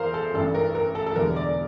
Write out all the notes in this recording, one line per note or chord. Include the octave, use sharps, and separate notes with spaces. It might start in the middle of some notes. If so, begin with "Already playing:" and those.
Already playing: E2 E3 A#4 C5 F5
A4
A1 G2 E3 A4
A#4
A#4
A4
A4
E1 E2 D3 G3 A#4
D5